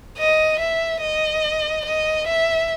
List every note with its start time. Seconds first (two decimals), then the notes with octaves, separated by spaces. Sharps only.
0.18 D#5
0.59 E5
1.01 D#5
1.85 D#5
2.27 E5